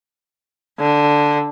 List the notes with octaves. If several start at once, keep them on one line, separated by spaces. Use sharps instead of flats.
D3